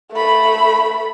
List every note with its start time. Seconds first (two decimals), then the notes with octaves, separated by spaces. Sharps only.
0.12 A3 B5